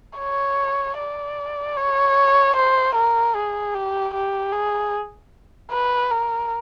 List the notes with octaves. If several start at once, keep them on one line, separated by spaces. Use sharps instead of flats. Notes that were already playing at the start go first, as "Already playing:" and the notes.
C#5
D5
C#5
C5
A#4
G#4
G4
G4
G#4
B4
A#4